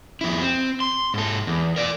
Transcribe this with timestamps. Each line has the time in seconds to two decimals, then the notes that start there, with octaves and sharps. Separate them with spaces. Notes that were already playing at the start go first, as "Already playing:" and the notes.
0.21 F2 E4
0.41 C4
0.80 C6
1.14 G#2 A4
1.47 E2
1.76 A#4 D5